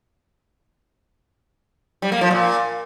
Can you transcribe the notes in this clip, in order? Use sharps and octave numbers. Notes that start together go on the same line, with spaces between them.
G3
A#3
F3
A#2